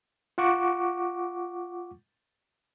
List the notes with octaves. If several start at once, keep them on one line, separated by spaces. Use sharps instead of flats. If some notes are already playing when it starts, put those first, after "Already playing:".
F4 F#5 C#6 D6